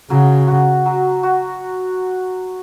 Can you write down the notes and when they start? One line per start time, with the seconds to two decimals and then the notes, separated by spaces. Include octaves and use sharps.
0.10 C#3 F#3
0.48 F#4
0.86 F#3
1.23 F#4